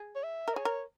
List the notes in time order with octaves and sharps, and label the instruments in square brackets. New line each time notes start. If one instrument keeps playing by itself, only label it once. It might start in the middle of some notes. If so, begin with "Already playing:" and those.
Already playing: [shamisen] G#4
[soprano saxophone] C#5
E5
[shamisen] A#4
[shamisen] G#4 [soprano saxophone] C#5
[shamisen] A#4